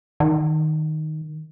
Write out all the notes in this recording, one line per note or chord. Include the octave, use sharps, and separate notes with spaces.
D#3